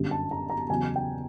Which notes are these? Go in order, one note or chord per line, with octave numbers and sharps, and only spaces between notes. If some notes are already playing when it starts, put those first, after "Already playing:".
Already playing: G1 F#2 D3 G3
A5
A#5
A#5
E2 C#3 F#3 G#5
G5